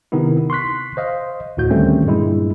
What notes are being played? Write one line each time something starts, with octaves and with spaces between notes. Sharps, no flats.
C3 D#3 B3 D#4 E4
C6 C#6 F#6 B6
C5 D#5 F5
D2 A2 F#4 G6
D3 D#3 G3 A3 C4 C#4
G2 A#2 G#3 E4